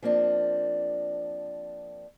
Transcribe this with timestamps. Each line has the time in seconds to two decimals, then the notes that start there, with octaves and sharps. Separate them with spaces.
0.02 F3 A#3 C4 D4